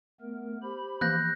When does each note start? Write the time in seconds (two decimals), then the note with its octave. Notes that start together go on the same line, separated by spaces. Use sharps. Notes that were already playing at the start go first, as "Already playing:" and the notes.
0.21 A3 B3 A#4
0.63 G4 C5 B5
1.01 E3 F3 A#3 F#6 G6 A#6